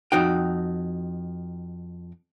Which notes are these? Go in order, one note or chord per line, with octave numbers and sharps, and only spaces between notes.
F2 D#4 F#4 G5